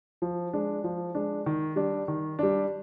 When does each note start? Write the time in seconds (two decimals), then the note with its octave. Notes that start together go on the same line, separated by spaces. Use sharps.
0.22 F3
0.53 G#3 D4
0.84 F3
1.15 G#3 D4
1.46 D#3
1.76 G3 D4
2.08 D#3
2.39 G3 D4